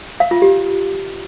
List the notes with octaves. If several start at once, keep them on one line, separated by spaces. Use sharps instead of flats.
F5
F4
G4